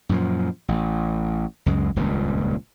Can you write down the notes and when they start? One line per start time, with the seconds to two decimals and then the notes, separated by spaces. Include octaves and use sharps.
0.09 F#2 A#2 F3
0.68 A1
1.66 C#2 F#2 G#3
1.96 D#1 C#2 G2 A#2